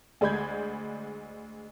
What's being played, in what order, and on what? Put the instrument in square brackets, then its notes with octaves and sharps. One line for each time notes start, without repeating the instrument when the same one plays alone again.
[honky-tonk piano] D2 G#3 D5 B5 G6 G#6